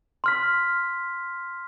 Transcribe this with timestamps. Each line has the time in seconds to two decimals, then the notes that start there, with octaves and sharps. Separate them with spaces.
0.24 C6 F6 B6